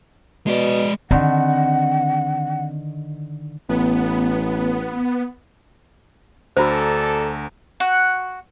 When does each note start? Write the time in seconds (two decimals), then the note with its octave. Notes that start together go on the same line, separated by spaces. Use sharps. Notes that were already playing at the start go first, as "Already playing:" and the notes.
0.47 B2 G#3 D5
1.11 D3 D#3 C4 F#5
3.69 A1 B3
6.57 D2 D4 F#4 A4 C5 A#5
7.80 F#4 F#5